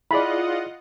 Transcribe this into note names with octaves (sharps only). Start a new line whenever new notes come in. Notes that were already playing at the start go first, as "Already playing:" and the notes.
E4 F4 G#4 D5 D#5 F#5 B5